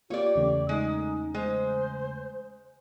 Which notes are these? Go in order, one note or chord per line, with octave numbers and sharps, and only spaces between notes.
A#3 F4 G4 C#5 D5
E2 C#3 A3
G#3 D#4
G#3 C5